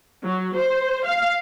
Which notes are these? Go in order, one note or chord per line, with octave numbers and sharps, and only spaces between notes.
F#3
C5
F5